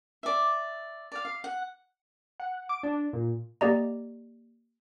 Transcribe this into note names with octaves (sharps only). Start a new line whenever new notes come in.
D5 E5
D5 F5
F5
F#5
F#5
D6
D4
A#2
A#3 G4 D5 D#5 A#5